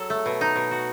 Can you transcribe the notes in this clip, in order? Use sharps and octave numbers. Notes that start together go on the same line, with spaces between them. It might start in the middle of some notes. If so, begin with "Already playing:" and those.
Already playing: F#3 A4
A3
B2
D#4
B2
F#4